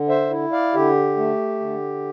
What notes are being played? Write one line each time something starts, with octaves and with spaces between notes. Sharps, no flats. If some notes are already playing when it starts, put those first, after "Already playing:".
Already playing: D3
C5 E5
E4
D5 F5
D3 G4
A3
D3